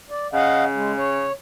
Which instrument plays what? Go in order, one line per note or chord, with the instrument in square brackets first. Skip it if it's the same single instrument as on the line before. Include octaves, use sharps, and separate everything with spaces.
[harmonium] D5
[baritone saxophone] C#3 [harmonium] D#5 F5 F#5
[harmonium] G#3
C#5